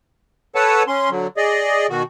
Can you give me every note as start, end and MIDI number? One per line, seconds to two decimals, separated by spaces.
0.55 0.83 69
0.55 0.83 71
0.55 0.83 73
0.55 0.83 78
0.55 0.83 81
0.88 1.10 61
0.88 1.10 84
1.10 1.27 50
1.10 1.27 54
1.37 1.87 68
1.37 1.87 74
1.37 1.87 75
1.90 2.03 47
1.90 2.03 51
1.90 2.03 66